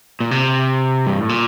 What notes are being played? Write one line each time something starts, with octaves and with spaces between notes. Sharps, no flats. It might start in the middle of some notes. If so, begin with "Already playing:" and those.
A#2
C3
G2
A2
A#2